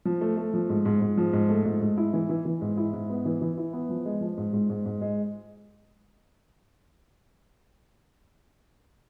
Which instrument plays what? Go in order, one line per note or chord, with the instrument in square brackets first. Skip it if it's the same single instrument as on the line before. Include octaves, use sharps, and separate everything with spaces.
[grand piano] F3
A3
A3
F3
G#2
G#2
G#2
F3
G#2
A3
G#2
G#2
E4
E3
E3
E3
G#2
E4
G#2
B3
E3
E3
E4
B3
F3
G#3
F3
G#2
G#2
G#2
G#2
G#3